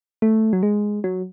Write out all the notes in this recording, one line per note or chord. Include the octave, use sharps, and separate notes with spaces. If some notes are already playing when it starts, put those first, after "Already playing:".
A3
F#3
G#3
F#3